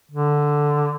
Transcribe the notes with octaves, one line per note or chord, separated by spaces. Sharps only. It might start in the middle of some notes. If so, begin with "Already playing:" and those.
D3